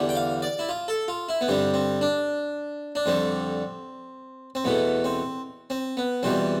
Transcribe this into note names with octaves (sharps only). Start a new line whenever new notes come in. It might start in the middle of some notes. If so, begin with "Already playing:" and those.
Already playing: E2 D3 G3
G5
F5
D5
E4
F4
A4
F4
E4
B3
G2 D3 G3 C4
C4
D4
D4
F2 D3 G3 C4
C4
E2 B2 A3 B3
C4
C4
B3
E2 B2 G3 C4